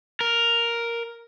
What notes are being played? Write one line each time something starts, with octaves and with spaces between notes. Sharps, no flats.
A#4